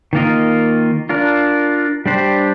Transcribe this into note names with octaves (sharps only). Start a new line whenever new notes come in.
D#3 A#3 F4 A#4 D#5
D4 F4 A#4
G3 D4 G4 C5